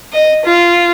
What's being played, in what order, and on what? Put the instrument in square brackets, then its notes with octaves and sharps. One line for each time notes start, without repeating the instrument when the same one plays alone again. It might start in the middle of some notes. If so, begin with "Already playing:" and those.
[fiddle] D#5
F4